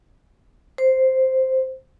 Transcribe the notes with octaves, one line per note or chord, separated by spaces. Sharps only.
C5